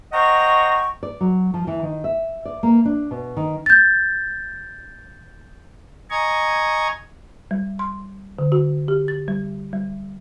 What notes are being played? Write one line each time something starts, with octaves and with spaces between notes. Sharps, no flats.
C5 D#5 F#5 G5 A#5 C#6
D5
F#3
F3
E3
D#3
E5
D5
A#3
D4
B2
D#3
G6 A6
D#5 G#5 A#5 C#6 G#6
G3
C6
D3
F#4
G4
A6
G3
G3